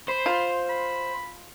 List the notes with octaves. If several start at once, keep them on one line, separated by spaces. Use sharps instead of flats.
C5 B5
F4
B5